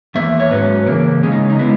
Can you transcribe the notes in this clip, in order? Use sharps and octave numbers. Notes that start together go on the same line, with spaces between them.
E2 D#3 A#3 E5
C#5
G#2 F#3 C#4 B4
C#3 E3 A#3 A#4
C#3 G#3 C#4 G#4
D#4
D#4
G#3 B3 E4